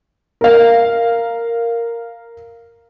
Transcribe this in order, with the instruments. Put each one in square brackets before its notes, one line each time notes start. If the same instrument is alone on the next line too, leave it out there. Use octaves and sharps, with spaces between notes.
[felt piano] A#4 F5